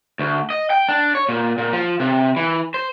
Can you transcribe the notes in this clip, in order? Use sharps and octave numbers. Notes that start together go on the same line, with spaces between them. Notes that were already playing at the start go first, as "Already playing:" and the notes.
D2
D#5
G5
D4
C#5
A#2
A#2
F3
C3
E3
C5